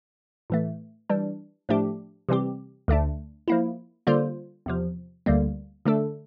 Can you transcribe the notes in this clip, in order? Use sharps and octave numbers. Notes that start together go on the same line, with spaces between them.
A2 E3 A3
E3 G3 D4
A2 F3 A3 D4 G4
C3 E3 G3 C4 G4
D2 D3 A3 D4
F3 A#3 E4
D3 G3 A#3 F4 C5
E2 C3 F3
D2 D3 G3 A#3
D3 A3 D4 A4